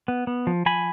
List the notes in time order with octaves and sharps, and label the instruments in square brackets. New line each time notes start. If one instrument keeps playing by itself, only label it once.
[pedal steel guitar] B3
B3
F3
F3 G#5 B5